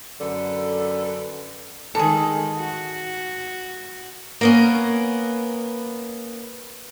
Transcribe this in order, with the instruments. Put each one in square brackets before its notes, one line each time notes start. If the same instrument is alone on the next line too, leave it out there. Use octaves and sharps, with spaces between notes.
[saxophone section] F#2 D3 A4 B4
[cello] D#3 G#3 [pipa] G#4 A4
[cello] F#4
[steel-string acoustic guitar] A#3 B3 C#4